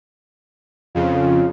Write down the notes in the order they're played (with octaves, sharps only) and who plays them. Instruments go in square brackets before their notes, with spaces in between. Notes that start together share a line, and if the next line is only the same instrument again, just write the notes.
[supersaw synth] F2 C#3 [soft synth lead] F4